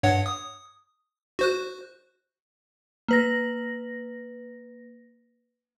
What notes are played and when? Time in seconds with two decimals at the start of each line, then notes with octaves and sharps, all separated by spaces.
0.03 G2 C#5 F#5
0.26 D#6
1.39 F#4 C5 F#6
3.08 A#3 B4 A#6